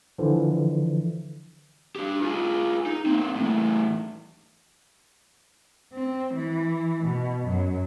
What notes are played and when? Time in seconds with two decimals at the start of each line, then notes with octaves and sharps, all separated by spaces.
0.19 D3 E3 F3
1.96 D4 G4
2.22 F4 G#4
2.86 D#4
3.06 A#3 C4
3.36 E2 A2
5.93 C4
6.35 E3
7.04 B2
7.44 F#2